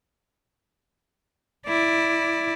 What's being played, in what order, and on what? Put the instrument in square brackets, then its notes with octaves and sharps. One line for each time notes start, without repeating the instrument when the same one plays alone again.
[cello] E4 D5